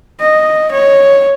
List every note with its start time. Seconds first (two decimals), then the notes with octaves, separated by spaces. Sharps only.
0.20 D#5
0.71 C#5